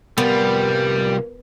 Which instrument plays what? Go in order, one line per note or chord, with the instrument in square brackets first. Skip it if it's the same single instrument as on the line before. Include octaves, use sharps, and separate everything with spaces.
[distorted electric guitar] C2 F4 [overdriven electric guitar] G3 [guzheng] B3 [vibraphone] A#4